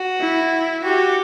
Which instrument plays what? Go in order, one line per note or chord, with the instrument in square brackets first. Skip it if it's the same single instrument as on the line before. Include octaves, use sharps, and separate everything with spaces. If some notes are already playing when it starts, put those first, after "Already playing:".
Already playing: [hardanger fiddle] F#4
[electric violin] E4
[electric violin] F#4 [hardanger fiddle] G4